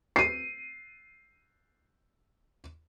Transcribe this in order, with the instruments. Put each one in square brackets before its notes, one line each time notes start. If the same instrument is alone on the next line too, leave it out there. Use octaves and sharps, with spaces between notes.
[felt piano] C7 D#7